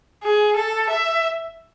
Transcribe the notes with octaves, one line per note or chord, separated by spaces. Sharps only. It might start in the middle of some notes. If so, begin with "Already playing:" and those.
G#4
A4
E5